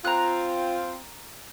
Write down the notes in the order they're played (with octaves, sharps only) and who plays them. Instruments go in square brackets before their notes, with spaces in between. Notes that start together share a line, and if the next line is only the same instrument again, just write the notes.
[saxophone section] C4 F4 [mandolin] A#5 F#6